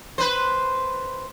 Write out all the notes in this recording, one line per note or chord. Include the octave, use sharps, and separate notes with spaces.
B4 C5